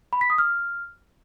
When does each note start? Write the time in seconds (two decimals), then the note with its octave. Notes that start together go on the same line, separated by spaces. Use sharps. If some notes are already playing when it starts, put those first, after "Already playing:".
0.13 B5
0.21 B6
0.30 D#6
0.38 F6